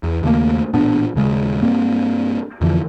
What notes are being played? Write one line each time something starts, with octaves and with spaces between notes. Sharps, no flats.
E2
D#2 C#3 A3 A#3
A1 A#2 B3 D4
D#1 C#3 G#3
G2 A#3 C4
F2 D3 E3 F3